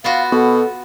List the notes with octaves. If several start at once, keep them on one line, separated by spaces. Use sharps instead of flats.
B3 F4 F#4 F5
B2 A4